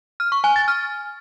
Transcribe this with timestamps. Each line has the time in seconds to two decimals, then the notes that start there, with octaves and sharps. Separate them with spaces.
0.20 F6
0.32 C#6
0.44 G#5
0.56 A6
0.68 F6